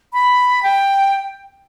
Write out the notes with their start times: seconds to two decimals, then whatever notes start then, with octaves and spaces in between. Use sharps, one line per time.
0.13 B5
0.63 G5